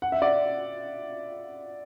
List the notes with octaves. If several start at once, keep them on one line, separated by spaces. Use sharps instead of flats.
F#5
E5
D5 F#5